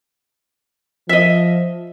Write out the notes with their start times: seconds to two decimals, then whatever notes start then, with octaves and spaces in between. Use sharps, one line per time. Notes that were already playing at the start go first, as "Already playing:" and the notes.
1.09 F3 D#5 E5